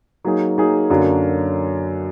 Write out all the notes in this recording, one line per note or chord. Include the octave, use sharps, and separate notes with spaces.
F#3 A#3 D#4 G#4
F#3 A#3 D#4 G#4
F#2 D3 F#3 A#3 D4